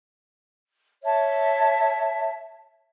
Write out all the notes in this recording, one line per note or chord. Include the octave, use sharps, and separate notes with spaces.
C#5 E5 A5